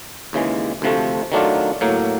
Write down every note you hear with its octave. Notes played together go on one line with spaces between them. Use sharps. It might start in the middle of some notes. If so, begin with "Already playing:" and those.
D#2 C#3 E3 G#3
D2 C3 F3 A3
D#3 F#3 A3 D4 F4
A2 F#3 A#3